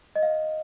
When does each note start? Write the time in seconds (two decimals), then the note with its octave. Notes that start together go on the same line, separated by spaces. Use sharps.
0.16 D#5
0.23 F5